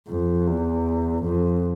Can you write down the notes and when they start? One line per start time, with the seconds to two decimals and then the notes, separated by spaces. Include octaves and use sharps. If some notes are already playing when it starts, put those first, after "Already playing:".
0.08 F2
0.47 E2
1.24 F2